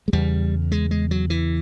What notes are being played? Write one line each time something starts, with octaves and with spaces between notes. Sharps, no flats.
G#3
E2 C#3 G3
G#3
G#3
F#3
E3